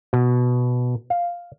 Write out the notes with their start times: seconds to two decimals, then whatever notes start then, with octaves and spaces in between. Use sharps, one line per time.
0.13 B2
1.10 F5